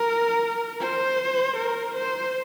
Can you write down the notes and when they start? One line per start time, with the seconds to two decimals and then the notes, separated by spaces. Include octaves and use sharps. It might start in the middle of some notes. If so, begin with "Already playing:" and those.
Already playing: A#4
0.80 C5
1.56 A#4
1.94 C5